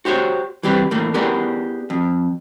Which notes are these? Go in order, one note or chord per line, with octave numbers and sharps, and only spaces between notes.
F#4 G4 C5 C#5
E3 G3 C4 G4 B4
A2 E3 A3 A#3
B3 E4 G4 G#4 A#4 D5
F2